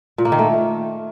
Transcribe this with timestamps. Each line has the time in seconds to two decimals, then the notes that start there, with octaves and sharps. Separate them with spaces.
0.18 A#2
0.25 A#3
0.32 D#3
0.39 A3